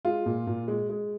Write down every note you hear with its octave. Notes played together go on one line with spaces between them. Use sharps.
G#3 F4
A#2
A#2
G#3
G#3